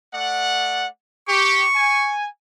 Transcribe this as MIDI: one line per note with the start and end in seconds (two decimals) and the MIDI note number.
0.14 0.86 57
0.14 0.86 74
0.14 0.86 78
1.28 1.66 67
1.28 2.11 85
1.75 2.27 80